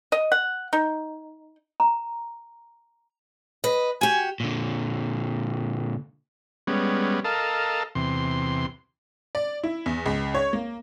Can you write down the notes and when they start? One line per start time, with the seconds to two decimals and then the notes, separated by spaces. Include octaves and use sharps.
0.12 D#5
0.32 F#5
0.73 D#4
1.80 A#5
3.64 B4 D#5
4.01 F#4 G4 G#5
4.40 A#2 D3
6.67 G3 G#3 B3 C#4
7.25 A4 A#4 D#5 F5 A5
7.95 E2 C3 C6
9.35 D5
9.63 E4
9.86 E2
10.06 C#2
10.35 C#5
10.53 A#3